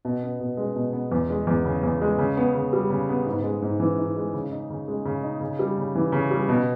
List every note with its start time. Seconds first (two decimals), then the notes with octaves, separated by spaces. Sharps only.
0.05 B2
0.23 B3
0.40 B2
0.57 G#3
0.76 B2
0.93 B3
1.12 E2
1.30 G#3
1.47 E2
1.65 C#3
1.83 E2
2.02 G#3
2.18 C#3
2.37 B3
2.55 C#3
2.73 G3
2.90 C#3
3.09 B3
3.26 G#2
3.44 G#3
3.62 G#2
3.80 E3
3.97 G#2
4.16 G#3
4.34 C#3
4.52 D#4
4.70 C#3
4.88 G#3
5.05 C#3
5.23 D#4
5.41 C#3
5.59 G3
5.78 C#3
5.95 E3
6.12 C#3
6.31 G3
6.49 B2